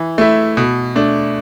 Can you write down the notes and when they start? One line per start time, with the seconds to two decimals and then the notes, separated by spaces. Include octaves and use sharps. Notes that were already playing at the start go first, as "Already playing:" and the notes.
Already playing: E3
0.18 A3 E4
0.57 B2
0.96 A3 D4